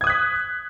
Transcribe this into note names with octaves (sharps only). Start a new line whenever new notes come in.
D#6 F#6 G#6 B6